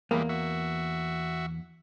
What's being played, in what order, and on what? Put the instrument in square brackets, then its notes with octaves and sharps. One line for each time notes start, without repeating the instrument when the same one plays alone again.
[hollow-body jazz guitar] E2 A#3 [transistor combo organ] E3 G3 G#3
[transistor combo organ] F#4 E5